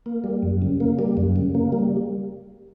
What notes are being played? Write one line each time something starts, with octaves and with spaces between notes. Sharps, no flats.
A#3
G3
F#2
C#3
A#3
G3
F#2
C#3
A#3
G3